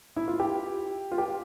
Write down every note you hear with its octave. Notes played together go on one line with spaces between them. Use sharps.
E4
F4
G4
F4
G4